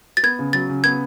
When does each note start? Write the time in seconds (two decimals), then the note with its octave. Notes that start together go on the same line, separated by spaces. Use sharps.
0.17 A6
0.23 B3 G#6
0.39 C#3
0.53 F#3 A6
0.69 C#3
0.84 B3 G#6